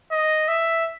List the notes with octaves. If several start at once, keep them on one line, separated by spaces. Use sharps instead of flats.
D#5
E5